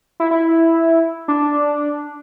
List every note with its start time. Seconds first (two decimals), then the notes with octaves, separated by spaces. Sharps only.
0.20 E4
0.31 E4
1.28 D4